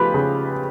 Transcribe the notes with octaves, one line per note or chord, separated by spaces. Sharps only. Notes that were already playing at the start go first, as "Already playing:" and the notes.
Already playing: C#3 F3 A3 F4 G4 B4 B5
C#3